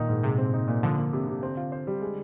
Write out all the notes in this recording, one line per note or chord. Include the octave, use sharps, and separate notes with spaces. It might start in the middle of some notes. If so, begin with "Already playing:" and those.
Already playing: A#2 D#3 A#3 D#4
G#2
C3 G#3
C4
D#4
A#2
D3 F3
A#3
C3
C3
C4
F4
C5
G3
G#3